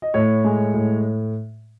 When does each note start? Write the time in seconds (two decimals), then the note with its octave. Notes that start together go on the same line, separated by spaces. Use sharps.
0.02 D#5
0.14 A2 C#5
0.44 G#3
0.74 A2